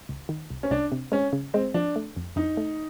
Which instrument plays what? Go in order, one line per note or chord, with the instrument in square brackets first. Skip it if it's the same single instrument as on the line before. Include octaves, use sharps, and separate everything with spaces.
[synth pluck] C#2
D#3
C2
[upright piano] C#4
[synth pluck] C2 [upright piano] D4
[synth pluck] C3
[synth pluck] G#3 [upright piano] C#4
[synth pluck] C#3
[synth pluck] G#3 [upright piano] C4
[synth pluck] F3 [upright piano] D4
[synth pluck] A3
F2
[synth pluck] F2 [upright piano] D#4
[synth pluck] A3